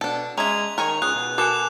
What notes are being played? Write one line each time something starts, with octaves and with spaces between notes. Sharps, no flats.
B2 D4 A4
G#3 C#4 E5 A#5 G#6 F7
D#3 A#4 C#5 G#5
C#2 G#4 F#6
B2
F#4 A4 A#4 G#5 D6 F#6 E7